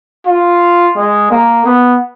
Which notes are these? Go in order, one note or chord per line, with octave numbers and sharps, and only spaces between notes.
F4
G#3
A#3
B3